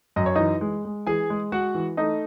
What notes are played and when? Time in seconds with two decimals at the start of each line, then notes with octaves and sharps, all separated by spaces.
0.16 F#2 D#5
0.26 C#5
0.35 E3 D#4 D#5
0.61 G#3
0.85 G#3
1.07 E3 G#4 G#5
1.30 G#3
1.52 G#3 F#4 F#5
1.75 E3
1.97 A3 D#4 D#5